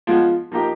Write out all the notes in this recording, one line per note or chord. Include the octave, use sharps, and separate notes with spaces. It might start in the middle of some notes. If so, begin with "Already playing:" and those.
F3 G#3 B3 F4
F3 A#3 D#4 G4